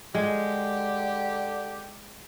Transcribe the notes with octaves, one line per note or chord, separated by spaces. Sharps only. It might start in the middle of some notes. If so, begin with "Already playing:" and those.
D3 G#3 G4